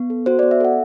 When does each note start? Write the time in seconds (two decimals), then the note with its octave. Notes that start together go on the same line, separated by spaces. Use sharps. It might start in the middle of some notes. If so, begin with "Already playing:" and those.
Already playing: B3
0.10 A4
0.26 F#4 C5
0.39 B3 D5
0.51 E5
0.60 A4 F#5